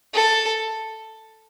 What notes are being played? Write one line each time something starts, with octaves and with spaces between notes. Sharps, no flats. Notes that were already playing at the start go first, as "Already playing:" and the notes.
A4